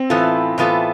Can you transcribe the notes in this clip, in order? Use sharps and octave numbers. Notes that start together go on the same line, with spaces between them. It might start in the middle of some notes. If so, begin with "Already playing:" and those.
Already playing: C4
A2 E3 B3 F4 A4
A2 E3 B3 F4 A4